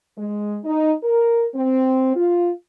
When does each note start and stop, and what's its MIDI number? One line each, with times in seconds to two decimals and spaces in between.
0.17 0.59 56
0.64 0.93 63
1.04 1.45 70
1.55 2.12 60
2.16 2.51 65